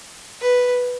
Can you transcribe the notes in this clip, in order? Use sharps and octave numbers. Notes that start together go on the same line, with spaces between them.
B4